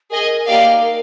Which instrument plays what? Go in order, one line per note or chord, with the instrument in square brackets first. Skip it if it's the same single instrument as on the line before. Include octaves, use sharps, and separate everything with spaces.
[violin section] G#4 D#5 G#5 [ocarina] A#4
[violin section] A#3 D#4 G4 D5 F5
[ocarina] A#4